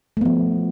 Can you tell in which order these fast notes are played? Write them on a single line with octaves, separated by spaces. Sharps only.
A3 B3 F3